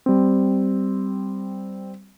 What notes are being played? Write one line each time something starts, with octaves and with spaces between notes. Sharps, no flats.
G3 C4